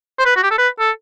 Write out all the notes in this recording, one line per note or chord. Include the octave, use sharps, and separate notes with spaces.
C5
B4
F#4
G4
A4
B4
A4